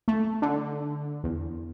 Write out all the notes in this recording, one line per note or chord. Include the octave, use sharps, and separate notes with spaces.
A3
D3
E2